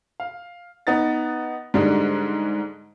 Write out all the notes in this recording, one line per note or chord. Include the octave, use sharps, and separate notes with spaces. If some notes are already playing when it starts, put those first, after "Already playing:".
F5
B3 D#4 A6
G#2 D3 G3 G#3